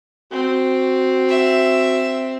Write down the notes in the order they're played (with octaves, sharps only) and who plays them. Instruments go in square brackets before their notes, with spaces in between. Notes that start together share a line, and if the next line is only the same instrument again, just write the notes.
[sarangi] C4 [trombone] F#4
[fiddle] E5